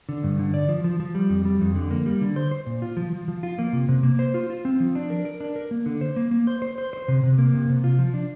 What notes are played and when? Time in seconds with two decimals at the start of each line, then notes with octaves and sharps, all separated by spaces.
0.09 D3
0.24 G2
0.39 D3
0.54 D5
0.69 F3
0.84 F3
1.00 F3
1.15 G3
1.30 F2
1.45 G3
1.61 F2
1.76 D3
1.91 A#3
2.06 G3
2.21 D3
2.36 C5
2.51 C5
2.66 A#2
2.82 F4
2.97 F3
3.13 F3
3.28 F3
3.43 F4
3.59 A#3
3.73 C3
3.89 C3
4.03 A#3
4.19 C5
4.34 F4
4.50 F4
4.65 C4
4.80 F3
4.95 D4
5.10 A#4
5.25 A#4
5.41 D4
5.56 A#4
5.71 A#3
5.86 D3
6.01 C5
6.16 A#3
6.31 A#3
6.47 C5
6.62 C5
6.78 C5
6.93 C5
7.08 C3
7.24 C3
7.38 A#3
7.54 C3
7.69 C3
7.84 F4
7.99 F3
8.14 D4